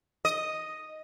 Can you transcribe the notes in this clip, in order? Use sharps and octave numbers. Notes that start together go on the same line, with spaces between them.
D#5